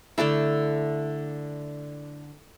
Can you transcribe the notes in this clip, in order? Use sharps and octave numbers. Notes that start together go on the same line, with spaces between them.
D3 A3 D4 E4